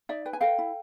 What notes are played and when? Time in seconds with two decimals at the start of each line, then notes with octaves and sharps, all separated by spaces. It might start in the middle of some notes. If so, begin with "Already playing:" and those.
0.09 D#4 D5 E5
0.26 B4 G5
0.33 G#5
0.41 A4 F5 G5
0.58 E4